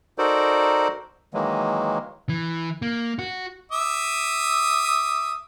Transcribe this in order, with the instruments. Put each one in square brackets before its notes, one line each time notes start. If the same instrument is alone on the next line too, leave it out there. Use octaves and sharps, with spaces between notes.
[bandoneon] D#4 F#4 A4 A#4 C5 D5
D#3 E3 F#3 G#3 A#3
[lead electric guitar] E3
A#3
F#4
[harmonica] E5 D6 D#6